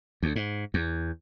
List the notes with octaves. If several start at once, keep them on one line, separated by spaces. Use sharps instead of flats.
D2
G#2
E2